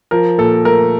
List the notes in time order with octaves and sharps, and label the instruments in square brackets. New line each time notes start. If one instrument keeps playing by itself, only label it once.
[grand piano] F3 A#4
A#2 A4
A3 A#4